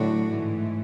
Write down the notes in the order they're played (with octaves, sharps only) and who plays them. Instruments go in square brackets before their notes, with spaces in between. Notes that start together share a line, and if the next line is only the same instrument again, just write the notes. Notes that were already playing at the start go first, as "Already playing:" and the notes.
Already playing: [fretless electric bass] A2 [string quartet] D3 F#3 A3 D4 F#4
[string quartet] G#2 E3 A3